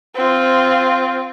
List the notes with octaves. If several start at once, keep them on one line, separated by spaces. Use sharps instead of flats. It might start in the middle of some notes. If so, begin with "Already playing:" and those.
C4 F4